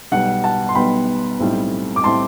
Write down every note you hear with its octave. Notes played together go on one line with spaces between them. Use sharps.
B1 B2 G3 B3 F#5
F#5 A5
C6
B1 B2 G3 B3 G5 B5
B1 A2 G3 C4
D6
A2 G3 C4 A5 C6